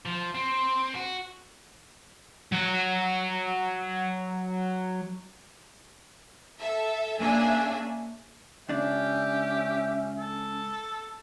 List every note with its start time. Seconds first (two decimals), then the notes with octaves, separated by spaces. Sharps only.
0.06 F3
0.35 C4
0.95 F#4
2.52 F#3 F#5
6.60 A4 E5
7.18 A#3 C#4 D4 G#4 E5 G#5
8.69 C#2 C#4 D4 G4 D5 E5
10.19 A4